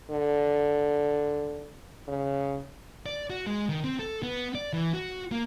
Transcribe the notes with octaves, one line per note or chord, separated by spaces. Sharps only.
D3
C#3
D5
F#4
G#3
D#3
C4
A4
B3
D5
E3
F#4
A#3